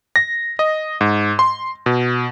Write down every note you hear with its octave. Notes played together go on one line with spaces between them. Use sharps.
A#6
D#5
G#2
C6
B2